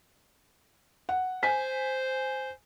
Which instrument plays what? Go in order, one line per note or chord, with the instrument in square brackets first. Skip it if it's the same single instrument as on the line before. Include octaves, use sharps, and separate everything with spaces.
[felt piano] F#5
[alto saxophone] C5 [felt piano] G#5 B6